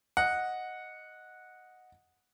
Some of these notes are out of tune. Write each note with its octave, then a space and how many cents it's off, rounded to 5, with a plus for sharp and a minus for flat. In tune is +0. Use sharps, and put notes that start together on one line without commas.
D#5 +0 F#5 -10